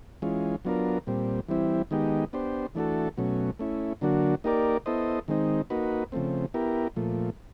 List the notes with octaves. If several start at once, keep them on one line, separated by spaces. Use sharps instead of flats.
E3 G#3 C#4 F4
F#3 B3 D4 F4 A#4
A#2 G3 C4
E3 G3 C4 E4
D#3 G#3 B3 D#4 G4
B3 D4 G4 C5
E3 A3 D4 F#4 A4
B2 F#3 A3 C#4
A3 C#4 E4
D3 F#3 A#3 D4 F#4
A#3 D#4 G4 A#4 D5
B3 E4 A4 C5 D#5
D#3 G#3 C4 D#4
A#3 D#4 F#4 B4
C#3 F3 A3 C4
B3 E4 G4 A#4
A#2 F3 A3